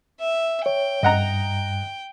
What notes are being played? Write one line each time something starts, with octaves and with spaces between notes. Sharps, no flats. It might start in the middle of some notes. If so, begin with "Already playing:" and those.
E5
C#5 G5
G2 D#5 F#5 A#5